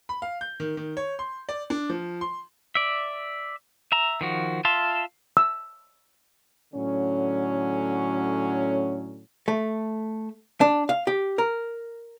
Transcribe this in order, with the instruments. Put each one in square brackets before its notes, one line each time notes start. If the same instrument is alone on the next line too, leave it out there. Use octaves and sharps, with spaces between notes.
[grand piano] B5
F5
G6
D#3
D#3
C#5
C6
D5
D4
F3
C6
[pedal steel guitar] D5 E5
E5 A#5
D#3 F3 F#4
F4 E5 F5 A5 C6
[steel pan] E6
[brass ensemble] A2 D3 F#3 C#4
[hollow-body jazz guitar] A3
D4
F5
G4
A#4